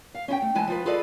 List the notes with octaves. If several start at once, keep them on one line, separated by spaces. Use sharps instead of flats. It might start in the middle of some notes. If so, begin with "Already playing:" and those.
F5
C#4 E4 G5
A3
F2 E3 G#3 G#5 A5
F3 F4 B4
F4 G#4 A4 B4 D5 D#5